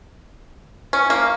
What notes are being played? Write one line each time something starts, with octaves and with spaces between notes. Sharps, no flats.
C#4
A#3